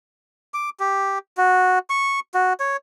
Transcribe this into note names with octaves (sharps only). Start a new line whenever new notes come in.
D6
G4
F#4
C#6
F#4
C#5